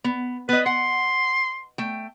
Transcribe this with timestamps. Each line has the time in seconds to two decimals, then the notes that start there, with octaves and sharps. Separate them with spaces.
0.04 B3
0.49 B3 B4 D#5
0.66 F#5 C6
1.78 A3 G5